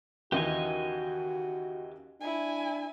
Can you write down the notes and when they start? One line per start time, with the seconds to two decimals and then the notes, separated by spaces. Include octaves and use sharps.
0.32 D#2 C#3 E3 F#4 G4 D#5 G#5
2.21 D4 E4 G#5